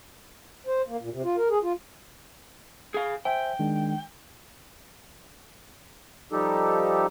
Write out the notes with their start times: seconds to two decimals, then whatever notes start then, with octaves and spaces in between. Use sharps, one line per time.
0.67 C5
0.88 A#3
1.01 A#2
1.12 C3
1.24 F4
1.37 A#4
1.50 G#4
1.63 F4
2.94 G#4 F5
3.25 C5 E5 G5 G#5
3.59 D#3 G#3 D4
6.32 F3 G3 D#4 G4 A4